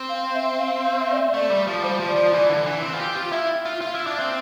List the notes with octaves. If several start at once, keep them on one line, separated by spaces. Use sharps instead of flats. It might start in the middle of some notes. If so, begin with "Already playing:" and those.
Already playing: C4
F5
E5
F5
F5
E5
D5
E5
A3 D5
G3
F3
G3 C5
F3
D5
F3
E3
D3
E3
C4
F4
G4
F4
E4 E5
F4
F4 E5
E4
D4
C4